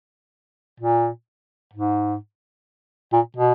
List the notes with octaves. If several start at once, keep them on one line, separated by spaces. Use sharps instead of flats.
A#2
G#2
A#2
B2